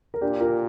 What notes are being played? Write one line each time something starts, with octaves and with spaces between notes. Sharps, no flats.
A#4
A#2 D4 G4
F4 A#4